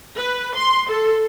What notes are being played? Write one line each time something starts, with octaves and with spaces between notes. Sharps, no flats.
B4
C6
A4